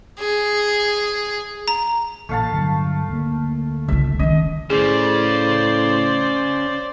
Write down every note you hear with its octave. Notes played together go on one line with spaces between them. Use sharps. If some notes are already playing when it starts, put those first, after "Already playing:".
G#4
A#5
A1 A#2 A3 F5 A5
G2 D3 F#3
D2 A#3
C#2 F4 E5
D#3 C#4 D#5
A2 C#3 G#4 C5 D5